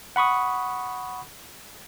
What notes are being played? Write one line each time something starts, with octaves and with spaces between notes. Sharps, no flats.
F#5 B5 C#6 D#6